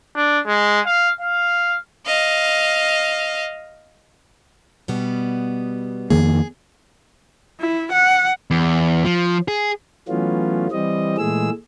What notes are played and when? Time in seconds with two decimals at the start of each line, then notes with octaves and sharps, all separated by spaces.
0.16 D4
0.47 G#3
0.86 F5
1.21 F5
2.06 D#5 F5
4.88 B2 G3 B3
6.10 F2 D#3 A#3 G#4
7.60 E4
7.92 F#5
8.51 E2
9.05 F3
9.48 G#4
10.08 E3 F#3 A3 B3 C#4 F4
10.72 E3 G3 C4 D#5
11.18 A#2 E3 G#3 A3 G#4 E6